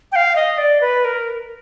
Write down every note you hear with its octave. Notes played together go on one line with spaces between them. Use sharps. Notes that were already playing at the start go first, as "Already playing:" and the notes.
G5
F5
D#5
D5
B4
A#4